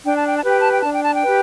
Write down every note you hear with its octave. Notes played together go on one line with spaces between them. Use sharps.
D4 G5
A5
G5
A5
G4 B4 G5
A5
G5
D4 A5
G5
A5
G5
G4 B4